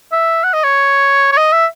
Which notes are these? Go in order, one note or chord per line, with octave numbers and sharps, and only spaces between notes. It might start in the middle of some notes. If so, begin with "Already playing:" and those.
E5
F#5
D#5
C#5
C#5
D#5
E5